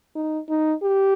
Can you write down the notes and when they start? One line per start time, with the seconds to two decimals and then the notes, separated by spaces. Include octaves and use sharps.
0.16 D#4
0.49 D#4
0.83 G4